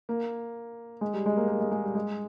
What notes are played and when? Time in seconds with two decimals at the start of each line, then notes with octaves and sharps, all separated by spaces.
0.09 A#3
1.01 G#3
1.14 G3
1.26 G#3
1.37 A#3
1.48 A#3
1.60 G#3
1.71 G#3
1.83 G3
1.95 G#3